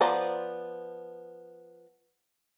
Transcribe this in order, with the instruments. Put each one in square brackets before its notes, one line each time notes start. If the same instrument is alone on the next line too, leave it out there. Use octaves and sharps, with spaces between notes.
[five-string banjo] F3 B3 C5 D5 A#5